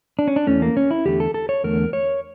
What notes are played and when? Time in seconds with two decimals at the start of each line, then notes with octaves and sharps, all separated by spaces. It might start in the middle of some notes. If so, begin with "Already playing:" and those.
0.19 D4
0.28 C#4
0.36 D4
0.47 E2 E3 A3 C#4
0.62 A#3
0.77 C#4
0.91 E4
1.06 E2 D3 A3 G4
1.20 A4
1.34 A4
1.49 C#5
1.64 E2 D3 A3 A#4
1.93 C#5